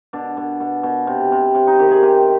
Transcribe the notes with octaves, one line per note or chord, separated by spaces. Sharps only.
B2 D4
B2
B2
B2
C3
C3
C3
D#4
D#3 G4
G#4
C3 G4